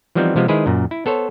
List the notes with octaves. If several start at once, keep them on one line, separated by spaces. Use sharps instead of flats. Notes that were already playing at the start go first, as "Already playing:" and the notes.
E3 F3 G3 B3 C4 D#4
C3 F3 G#3 B3
D#3 G#3 E4 G#4 B4 C5
F#2 A#2
E4
B3 A4 C5 C#5